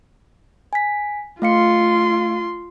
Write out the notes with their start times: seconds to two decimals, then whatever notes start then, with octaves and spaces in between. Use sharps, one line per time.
0.73 G#5 B6
1.42 A3 F4 F5 C6 C#7